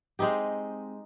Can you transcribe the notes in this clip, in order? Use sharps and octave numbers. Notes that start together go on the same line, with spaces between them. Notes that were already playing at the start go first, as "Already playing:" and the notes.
G#3 C4 D#4 G4